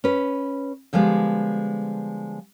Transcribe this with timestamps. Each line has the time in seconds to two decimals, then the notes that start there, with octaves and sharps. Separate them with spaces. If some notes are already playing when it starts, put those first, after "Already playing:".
0.04 C#4 B4
0.93 D3 F3 G3 G#3 B3